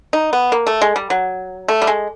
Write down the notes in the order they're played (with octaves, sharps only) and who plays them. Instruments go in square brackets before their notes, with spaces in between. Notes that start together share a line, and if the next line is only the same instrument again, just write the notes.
[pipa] D#4
B3
A#3
A3
G#3
G3
F#3
A3
G3
G#3